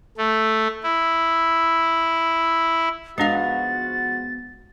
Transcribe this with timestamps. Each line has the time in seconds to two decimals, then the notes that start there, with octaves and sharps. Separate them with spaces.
0.17 A3
0.83 E4
3.18 G#2 F3 G#3 B3 D4 F#4 F5 A6